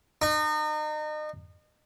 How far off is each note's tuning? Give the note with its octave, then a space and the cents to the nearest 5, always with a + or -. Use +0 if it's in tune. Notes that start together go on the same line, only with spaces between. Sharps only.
D#4 -35